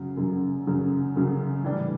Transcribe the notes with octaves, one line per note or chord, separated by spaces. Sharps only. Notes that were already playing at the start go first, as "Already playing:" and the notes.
Already playing: F#2 C#3 F#3
F#2 C#3 F#3
F#2 C#3 F#3
F#2 C#3 F#3
A2 E3 G3 D4